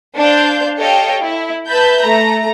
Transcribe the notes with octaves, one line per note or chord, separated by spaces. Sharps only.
D4 C5 F5 G6
G4 A4 C#5 D#5 F5 G5
E4
B4 E5 A5 B5 G6
A3 A#5